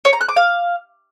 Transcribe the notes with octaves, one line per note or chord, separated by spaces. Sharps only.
C#5
A#5
F#6
D6
F5